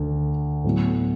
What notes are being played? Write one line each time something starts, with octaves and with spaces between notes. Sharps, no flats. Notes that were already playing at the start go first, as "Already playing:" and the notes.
Already playing: D2
A2 F#3 B3